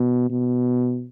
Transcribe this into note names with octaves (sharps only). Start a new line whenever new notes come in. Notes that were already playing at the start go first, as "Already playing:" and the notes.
Already playing: B2
B2